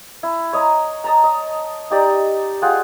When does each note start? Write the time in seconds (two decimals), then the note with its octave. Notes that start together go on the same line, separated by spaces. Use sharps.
0.23 E4
0.53 C#5 D#5 A#5
1.04 D#5 A5 A#5
1.24 D#5
1.90 D#4 G4 D5 D#5
2.62 F4 G#4 F#5 G5